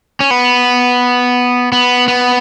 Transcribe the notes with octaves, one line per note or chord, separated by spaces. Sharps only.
C#4
B3
B3
B3